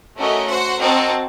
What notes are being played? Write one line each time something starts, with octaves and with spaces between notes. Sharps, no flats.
A3 C#4 F#4 A#4 D#5
F#4 C5 F#5
C4 F#4 A#4 D#5 A5